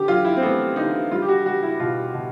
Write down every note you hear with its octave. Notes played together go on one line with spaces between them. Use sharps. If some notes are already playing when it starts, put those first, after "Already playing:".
Already playing: D3 G4
F#3 F4
E4
C4
A3 B3
D3 D#4
G3 F4
G4
F#4
G3 F#4
E4
B2 F4
B2